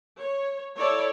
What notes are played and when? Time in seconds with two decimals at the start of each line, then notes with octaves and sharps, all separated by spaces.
0.20 C#5
0.78 E4 A4 C#5 D5